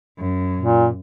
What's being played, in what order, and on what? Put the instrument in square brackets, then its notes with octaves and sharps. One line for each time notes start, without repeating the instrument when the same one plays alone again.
[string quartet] F#2
[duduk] A#2